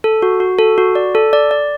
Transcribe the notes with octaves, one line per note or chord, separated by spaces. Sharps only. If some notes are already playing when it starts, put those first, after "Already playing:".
A4
F#4
F#4
A4
F#4
D5
A4
D5
D5